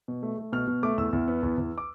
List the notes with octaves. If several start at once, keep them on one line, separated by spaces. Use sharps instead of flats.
B2
A3
A3
B2 F6
B2
A3 D6
E2 E6
E2
B3
E2
E2
D6